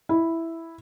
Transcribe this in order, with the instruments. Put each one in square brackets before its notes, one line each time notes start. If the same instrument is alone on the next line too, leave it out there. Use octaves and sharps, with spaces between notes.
[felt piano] E4